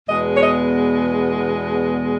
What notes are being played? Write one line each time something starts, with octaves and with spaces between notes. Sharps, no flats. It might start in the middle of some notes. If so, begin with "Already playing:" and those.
E2 B2 G#3 B3 D#5
C#5
D#5